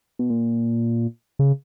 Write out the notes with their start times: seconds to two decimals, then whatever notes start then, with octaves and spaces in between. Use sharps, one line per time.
0.19 B2
0.30 A#2
1.39 C#3